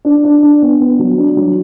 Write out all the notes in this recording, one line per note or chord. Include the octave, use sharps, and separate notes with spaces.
D4
D4
D4
B3
B3
F#3
D4
F#3